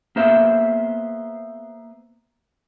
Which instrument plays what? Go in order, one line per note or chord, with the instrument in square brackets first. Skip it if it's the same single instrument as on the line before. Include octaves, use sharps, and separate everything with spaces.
[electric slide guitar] A#3 B3 G#4 C5 E5